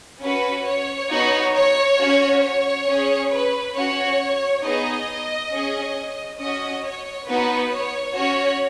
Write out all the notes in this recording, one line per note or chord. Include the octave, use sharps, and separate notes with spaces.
C#4 F#4 B4
C#5
B3 D#4 F#4
C#5
C#4 F#4
C#5
C#4 G#4
B4
C#4 F#4 C#5
B3 D#4 G#4 D#5
C#4 G#4
C#4 F#4 D#5
C#5
B3 D#4 F#4 B4
C#5
C#4 F#4 C#5